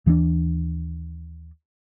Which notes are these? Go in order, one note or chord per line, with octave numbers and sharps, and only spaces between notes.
D#2 E3 A#3 D4